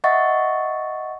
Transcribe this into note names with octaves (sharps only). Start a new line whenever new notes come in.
D#5 E5 F#5 C#6 A6